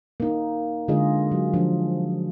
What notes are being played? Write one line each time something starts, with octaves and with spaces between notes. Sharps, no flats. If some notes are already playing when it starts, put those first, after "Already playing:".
A#3 D#4
D3 G#3 F4 G#4 D#5
F#3
F3 D4